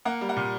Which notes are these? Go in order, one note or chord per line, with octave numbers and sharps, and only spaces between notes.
A#3 F#5
G3
F#5
A#2